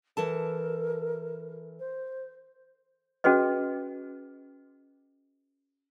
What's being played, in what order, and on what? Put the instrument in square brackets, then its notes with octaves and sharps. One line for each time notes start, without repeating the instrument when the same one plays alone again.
[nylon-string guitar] E3 A4 A5 [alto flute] A#4
[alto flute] C5
[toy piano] C#4 F#4 G#4 B4 D#5